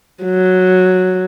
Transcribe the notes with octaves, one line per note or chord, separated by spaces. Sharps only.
F#3